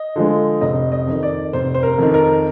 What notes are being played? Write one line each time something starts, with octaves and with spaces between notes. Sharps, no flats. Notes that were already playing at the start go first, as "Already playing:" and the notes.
Already playing: D#5
D3 F3 G#3
F1 D#5
D#5
F2 D#3
D5
F1 C5
C5
A#4
F2 D#3
A#4